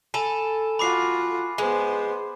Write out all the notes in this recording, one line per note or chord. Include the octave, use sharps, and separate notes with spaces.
A4 G#5 B5 D#7
F4 F#4 B5 D6 C7
G#3 B3 C5